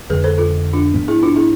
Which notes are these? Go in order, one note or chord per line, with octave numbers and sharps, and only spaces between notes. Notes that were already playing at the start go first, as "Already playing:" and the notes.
F2 D3 G#3 G#4 B4
A4 C5
F4 A4
D4 F4
G#2 F3 B3
E4 G#4
D4 F4
E4 G#4